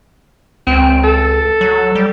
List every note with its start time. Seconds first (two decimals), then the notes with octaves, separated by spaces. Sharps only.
0.67 C#2 C4
1.04 A4
1.61 F#3
1.95 G3